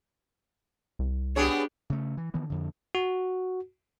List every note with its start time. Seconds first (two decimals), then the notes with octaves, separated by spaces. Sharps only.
0.99 C2
1.36 B3 D4 G4 G#4 C#5
1.90 C#3 A3
2.17 E3
2.34 D#3 E3 B3
2.50 F2 D3
2.95 F#4